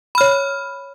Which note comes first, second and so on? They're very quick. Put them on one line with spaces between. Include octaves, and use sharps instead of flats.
B5 F6 C#5